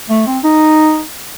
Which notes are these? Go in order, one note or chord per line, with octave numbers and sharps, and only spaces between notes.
A3
C4
D#4